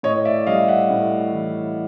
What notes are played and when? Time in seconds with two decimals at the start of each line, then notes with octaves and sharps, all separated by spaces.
0.03 A2 C#5 D#5
0.25 D5 E5
0.46 G3 D#5 F5
0.68 E5 F#5
0.90 A2
1.32 E3